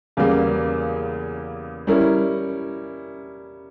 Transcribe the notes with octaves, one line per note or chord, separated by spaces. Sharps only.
E2 C#3 G3 A#3
G3 C#4 E4 A#4